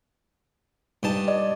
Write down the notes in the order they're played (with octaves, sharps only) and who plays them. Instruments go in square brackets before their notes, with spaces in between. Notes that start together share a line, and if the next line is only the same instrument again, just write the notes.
[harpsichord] G2 D#4 A5
[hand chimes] D5 D#5